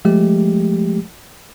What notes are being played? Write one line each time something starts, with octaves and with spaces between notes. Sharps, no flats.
F3 G#3 A3 G4